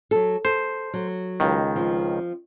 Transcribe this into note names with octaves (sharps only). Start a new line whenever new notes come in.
F#3 A4
A4 C5
F#3
C#2 D#3
F3 C4